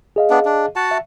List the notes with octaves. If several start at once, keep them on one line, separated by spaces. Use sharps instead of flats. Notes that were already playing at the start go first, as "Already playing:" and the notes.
G#4 D#5 F5
B3 D4
D4
F#4 F#5 A5
E5